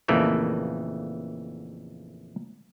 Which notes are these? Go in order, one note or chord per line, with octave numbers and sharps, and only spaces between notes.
A#1 F2 C#3 E3 A3 A#3